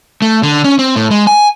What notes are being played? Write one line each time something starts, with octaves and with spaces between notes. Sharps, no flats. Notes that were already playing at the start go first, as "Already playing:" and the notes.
A3
D3
C#4
C4
A2
G#3
G#5